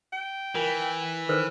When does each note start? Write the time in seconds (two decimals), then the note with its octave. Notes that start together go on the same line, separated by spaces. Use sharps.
0.13 G5
0.55 E3 F4 A#4
1.29 D#3 A4 B4 C5